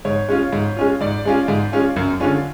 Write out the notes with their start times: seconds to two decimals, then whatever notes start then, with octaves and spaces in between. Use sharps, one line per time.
0.05 G#2 C#5
0.28 G#3 C#4 F4
0.53 G#2
0.76 G#3 C#4 F4
1.01 G#2 D5
1.25 G#3 C#4 F4
1.48 G#2
1.72 G#3 C#4 F4
1.96 F#2
2.20 D3 G#3 C#4 F4